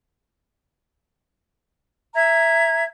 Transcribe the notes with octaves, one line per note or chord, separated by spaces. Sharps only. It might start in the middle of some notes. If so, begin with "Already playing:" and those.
E5 A#5 G#6